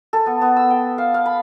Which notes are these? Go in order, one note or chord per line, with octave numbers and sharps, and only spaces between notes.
A4
B3
B3
E6
G5
F5
F5
B5